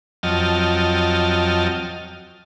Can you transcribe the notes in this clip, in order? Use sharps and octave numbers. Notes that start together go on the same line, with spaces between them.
F2 F#3 D#5 G5 A5 F6